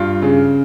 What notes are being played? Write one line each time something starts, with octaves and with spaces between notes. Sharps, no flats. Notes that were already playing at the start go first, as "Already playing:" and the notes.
Already playing: G2 F4
C#3